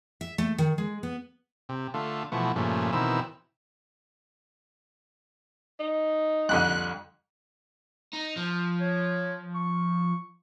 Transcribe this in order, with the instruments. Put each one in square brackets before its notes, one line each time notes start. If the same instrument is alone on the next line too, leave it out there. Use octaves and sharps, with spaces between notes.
[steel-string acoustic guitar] E5
A3
D#3
G#3
B3
[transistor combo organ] C3
D3 A3 F4
B2 E3 F3 A3 F#4
G2 A#2 C#3 F3 A3
B2 D#3 E3 C4 E6
[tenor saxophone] D#4
[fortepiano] C2 F2 D3 [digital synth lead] F#6
[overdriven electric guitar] D#4
F3
[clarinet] C#5
C#6